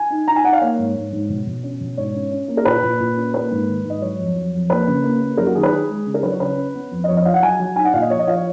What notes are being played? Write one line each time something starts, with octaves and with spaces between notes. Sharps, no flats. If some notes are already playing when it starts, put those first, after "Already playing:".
Already playing: G#5
D#4
D#4 A#5
G#5
D#4 F#5
F5
A#3 C#5
G#2
G#2
G#2
B2
B2
C#4
B2
G#2 C#5
C#4
C#4
A#3
A#4
A#2 B4
A#2
A#2
C#4
A#3 B4
G#2
D#3
G#2
D#5
F#3 C#5
F2
F#3
F2
A#3 B4
C#3
A#3
A#3
F#2 A#4
F#4
D#3 G#4
B4
D#3 G#4
G#3
C#3
A#4
F#3 B4
C#5
C#3 B4
C#4
B3
F2
D#5
F2 C#5
D#5
F3 F5
F#5
F#3 G#5
F#3
D#4 G#5
F#5
A#2 F5
D#5
F3 C#5
D#5
F3 F5
C#5